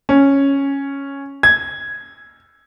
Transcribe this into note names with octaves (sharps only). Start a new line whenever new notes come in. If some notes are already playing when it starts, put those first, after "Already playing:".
C#4
G#6